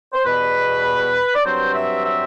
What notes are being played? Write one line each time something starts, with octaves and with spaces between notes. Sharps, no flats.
C5
E2 B2 G3 B4
D5
G2 F#3 C4 C5
E5
E5